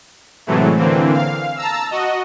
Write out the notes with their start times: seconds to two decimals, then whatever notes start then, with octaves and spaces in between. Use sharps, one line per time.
0.47 A2 C3 E3 F#3 G#3 A3
0.77 D3 E3 A#3 C4
1.14 F5
1.56 A5 A#5 E6
1.91 F#4 D#5